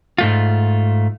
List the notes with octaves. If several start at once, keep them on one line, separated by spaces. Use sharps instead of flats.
G#2 A3 F4